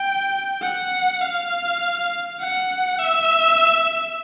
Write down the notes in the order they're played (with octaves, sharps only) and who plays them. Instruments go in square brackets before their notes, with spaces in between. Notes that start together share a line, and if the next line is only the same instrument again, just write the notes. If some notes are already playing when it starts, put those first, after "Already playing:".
Already playing: [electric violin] G5
F#5
F5
F#5
E5